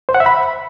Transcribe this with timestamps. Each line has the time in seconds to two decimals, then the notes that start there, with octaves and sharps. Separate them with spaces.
0.09 C5
0.15 F#5
0.20 E5
0.26 B5